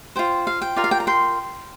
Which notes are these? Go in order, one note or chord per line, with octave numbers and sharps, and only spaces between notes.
F4 C5 G5
F5
G5
F4 A#4 D5
F5
G5
A#5
G5 C6